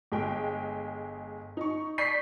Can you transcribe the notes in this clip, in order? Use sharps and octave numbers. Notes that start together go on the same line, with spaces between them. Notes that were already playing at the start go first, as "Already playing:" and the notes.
G1 G#3 G5
D#4 C#6
D5 C#6 G6 B6 C7